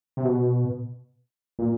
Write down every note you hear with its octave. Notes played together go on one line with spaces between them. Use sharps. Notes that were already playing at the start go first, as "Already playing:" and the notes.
C3
B2
A#2